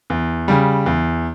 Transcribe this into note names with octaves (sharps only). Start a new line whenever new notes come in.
E2
C#3 G3
E2